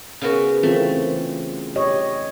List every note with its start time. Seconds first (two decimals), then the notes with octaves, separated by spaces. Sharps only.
0.21 C#3 B3 F#4
0.63 E3 A3 C4 F4
1.76 G4 C#5 D#5